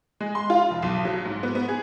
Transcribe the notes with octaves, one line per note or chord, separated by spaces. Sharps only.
G#3
C6
F4
F1
B1
F#3
G#2
B3
B3
G#4